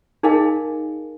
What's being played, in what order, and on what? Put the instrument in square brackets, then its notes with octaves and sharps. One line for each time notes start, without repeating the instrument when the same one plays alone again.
[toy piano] D#4 G#4 A#4 D#5 F5 G#5